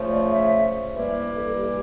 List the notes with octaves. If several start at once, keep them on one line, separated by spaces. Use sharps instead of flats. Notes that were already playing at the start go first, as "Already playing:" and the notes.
Already playing: C#3 F3 A3
D5
E5
G2 E3 G3 A#3 E5
A4
G4